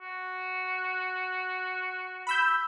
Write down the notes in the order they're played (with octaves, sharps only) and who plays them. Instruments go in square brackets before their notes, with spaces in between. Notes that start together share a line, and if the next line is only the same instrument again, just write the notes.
[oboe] F#4
[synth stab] B5 E6 G6